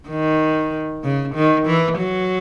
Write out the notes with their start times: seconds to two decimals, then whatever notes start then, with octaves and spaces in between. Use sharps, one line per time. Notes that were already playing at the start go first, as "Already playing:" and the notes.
0.09 D#3
1.03 C#3
1.35 D#3
1.66 E3
1.98 F#3